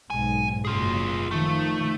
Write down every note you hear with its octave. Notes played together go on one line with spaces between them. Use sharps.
B1 G#2 G#5
F#1 F#2 F4 G#4
D#3 F3 A3